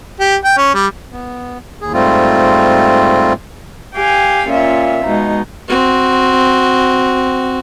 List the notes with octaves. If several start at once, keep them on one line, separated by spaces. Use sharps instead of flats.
G4
G5
C#4
G3
B3
D#2 G#4
G#2 G3 A3 C4 F4
G4 F5 G5 G#5
A#2 C#4 F4 E5
B2 G#3 D#4
C4 F#4